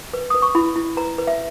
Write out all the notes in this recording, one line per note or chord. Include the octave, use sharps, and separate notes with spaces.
B4
B4 D#6
C#6
E4 B5
E4
B4 A#5
B4
E5